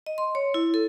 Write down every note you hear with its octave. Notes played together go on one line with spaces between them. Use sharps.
D#5
C6
C#5
E4
A4